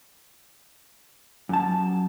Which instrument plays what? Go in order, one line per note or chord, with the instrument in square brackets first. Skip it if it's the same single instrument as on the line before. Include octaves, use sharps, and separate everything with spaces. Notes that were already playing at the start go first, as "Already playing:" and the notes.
[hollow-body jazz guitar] F#2 A5